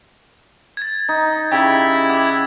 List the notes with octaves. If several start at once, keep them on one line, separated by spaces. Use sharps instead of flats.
G#6 A6
D#4
C#3 E4 G4
F#5 D6 G#6